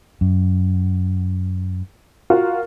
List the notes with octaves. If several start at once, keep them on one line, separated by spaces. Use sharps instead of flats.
F#2
F4 F#4 A#4